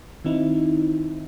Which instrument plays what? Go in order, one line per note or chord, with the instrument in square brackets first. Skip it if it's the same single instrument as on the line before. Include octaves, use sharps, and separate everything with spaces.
[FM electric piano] D#3 C4 D#4 E4